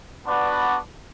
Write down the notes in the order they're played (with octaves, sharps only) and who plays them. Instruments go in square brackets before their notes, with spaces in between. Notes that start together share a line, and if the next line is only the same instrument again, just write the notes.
[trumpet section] B3 D4 F#4 B4 D5